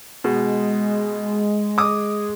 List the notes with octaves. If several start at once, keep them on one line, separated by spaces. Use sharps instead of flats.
B2 G#3
D6 D#6